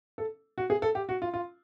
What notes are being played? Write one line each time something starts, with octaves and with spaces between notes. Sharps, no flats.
A4
F#4
G#4
A4
G4
F#4
F4
F4